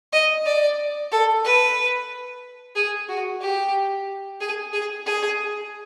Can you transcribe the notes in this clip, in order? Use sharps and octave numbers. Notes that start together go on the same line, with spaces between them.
D#5
D5
A4
B4
G#4
F#4
G4
G#4
G#4
G#4